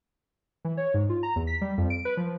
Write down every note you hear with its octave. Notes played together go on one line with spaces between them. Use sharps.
E3
C#5
G#2
F4
A#5
E2
B6
G3
F2
D7
B4
F3